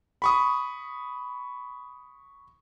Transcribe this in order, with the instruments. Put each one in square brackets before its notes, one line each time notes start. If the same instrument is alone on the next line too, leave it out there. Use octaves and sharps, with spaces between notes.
[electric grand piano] B5 C#6 D#6